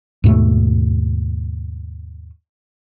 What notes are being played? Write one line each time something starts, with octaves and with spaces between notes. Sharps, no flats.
D#2 G#2 B2 A3